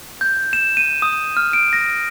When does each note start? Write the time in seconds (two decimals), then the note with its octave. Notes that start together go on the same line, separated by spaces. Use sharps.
0.21 G6
0.53 E7
0.77 D#7
1.02 D#6
1.37 F6
1.53 D7
1.73 A#6